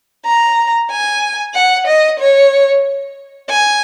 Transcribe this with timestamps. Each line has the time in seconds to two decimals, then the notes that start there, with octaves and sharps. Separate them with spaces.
0.26 A#5
0.91 G#5
1.55 F#5
1.87 D#5
2.20 C#5
3.50 G#5